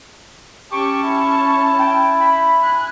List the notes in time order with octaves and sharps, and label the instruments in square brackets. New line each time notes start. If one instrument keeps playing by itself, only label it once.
[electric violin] C#4 A5 [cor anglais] G4 [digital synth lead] C#6
[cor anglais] E4
[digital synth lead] G5
B5
[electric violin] G#5 F#6